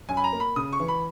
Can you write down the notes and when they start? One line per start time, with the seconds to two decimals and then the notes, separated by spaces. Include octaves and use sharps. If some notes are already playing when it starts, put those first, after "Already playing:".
0.09 F#2 G#5
0.17 B5
0.24 A#5
0.33 A#3
0.40 B5
0.56 C#3 D#6
0.73 C#6
0.80 E3
0.88 B5